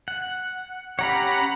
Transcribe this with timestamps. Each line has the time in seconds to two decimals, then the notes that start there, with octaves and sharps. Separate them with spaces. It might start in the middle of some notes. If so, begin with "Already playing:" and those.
0.08 F#5
0.99 C#4 G4 C#5 F#5 A#5 B5